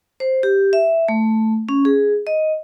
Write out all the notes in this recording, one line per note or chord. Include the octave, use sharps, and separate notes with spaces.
C5
G4
E5
A3
C#4
G#4
D#5